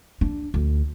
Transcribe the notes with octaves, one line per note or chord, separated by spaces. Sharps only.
D4
D2